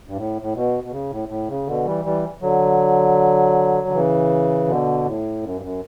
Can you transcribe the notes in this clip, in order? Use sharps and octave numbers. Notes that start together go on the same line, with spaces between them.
G2
A2
A2
B2
B2
C#3
A2
A2
C#3
B2 D3
E3 G3
E3 G3
D3 F#3
D3
C#3 E3
B2 D3
A2
F#2
G2
F#2